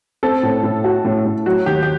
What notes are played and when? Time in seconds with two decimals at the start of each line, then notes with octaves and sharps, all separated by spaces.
0.23 C4 A4
0.43 A2
0.63 A2
0.84 F#4
1.04 A2
1.25 A2
1.46 F#3 F#4
1.66 D#2 G4
1.83 G4